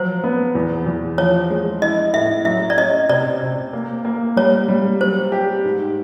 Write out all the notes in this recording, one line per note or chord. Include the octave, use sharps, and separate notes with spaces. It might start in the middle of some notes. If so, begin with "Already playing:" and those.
Already playing: F3 F#3 C5
B3
E2
E2
F3 C#5
G#3
E4 D#5
A2 E5
F#3 E5
D5
C#4 D#5
C3 D5
C3
A#3
A#3
G3 C#5
G3
F#3 C5
G4
G#2